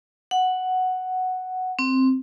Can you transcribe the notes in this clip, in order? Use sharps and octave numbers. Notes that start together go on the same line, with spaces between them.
F#5
C4